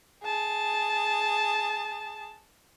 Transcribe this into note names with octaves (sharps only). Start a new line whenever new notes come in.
G#4 A5